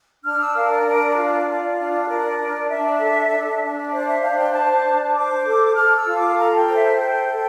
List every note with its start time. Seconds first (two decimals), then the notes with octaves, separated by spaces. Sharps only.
0.24 D4 F6
0.41 E6
0.55 A#4 F5
0.71 D5
0.86 D4 D5
1.17 F4
1.47 F4
1.78 D4
2.08 A#4 D5
2.39 D4
2.69 D4 E5
3.00 A4
3.31 D4
3.62 D4
3.93 C5 D5
4.07 E5
4.22 D4 F5
4.38 G5
4.53 C5 A5
4.84 D4
5.14 C5 D6
5.45 A4
5.75 A4 F6
5.96 E6
6.06 F4
6.17 D6
6.37 A4 A#5
6.57 G5
6.67 C5
6.77 E5
6.98 A4 G5
7.28 A4